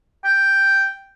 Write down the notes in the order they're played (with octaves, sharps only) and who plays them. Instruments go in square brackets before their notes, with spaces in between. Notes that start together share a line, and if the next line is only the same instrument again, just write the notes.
[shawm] G5